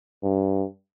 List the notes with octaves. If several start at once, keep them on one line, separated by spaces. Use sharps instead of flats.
G2